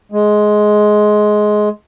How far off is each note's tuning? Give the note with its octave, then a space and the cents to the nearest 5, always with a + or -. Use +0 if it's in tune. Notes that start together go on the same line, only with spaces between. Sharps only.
G#3 +15